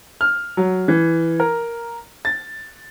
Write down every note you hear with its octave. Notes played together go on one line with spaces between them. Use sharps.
F6
F#3
E3
A#4
A6